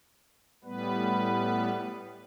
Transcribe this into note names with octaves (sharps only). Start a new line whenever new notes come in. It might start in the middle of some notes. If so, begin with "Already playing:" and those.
A2 G3 B3 B4